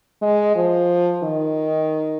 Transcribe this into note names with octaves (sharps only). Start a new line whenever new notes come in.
G#3
F3
D#3